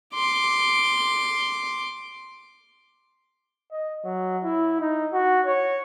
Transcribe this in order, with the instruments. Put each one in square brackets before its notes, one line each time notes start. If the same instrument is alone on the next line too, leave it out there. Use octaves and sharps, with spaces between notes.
[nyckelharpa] C6 D6
[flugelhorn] D#5
F#3
E4
D#4
F#4
C#5